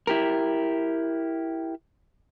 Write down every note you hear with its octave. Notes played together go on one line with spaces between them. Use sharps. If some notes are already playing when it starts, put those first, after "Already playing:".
E4 G4 A#4